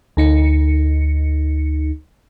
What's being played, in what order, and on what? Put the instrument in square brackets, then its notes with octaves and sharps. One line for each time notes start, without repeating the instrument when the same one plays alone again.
[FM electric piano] D2 D#4 C#7